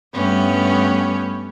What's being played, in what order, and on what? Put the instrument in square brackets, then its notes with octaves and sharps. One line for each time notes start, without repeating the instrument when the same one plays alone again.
[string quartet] G2 A3 B3 C#4 G4